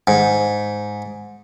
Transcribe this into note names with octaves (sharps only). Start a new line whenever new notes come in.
G#2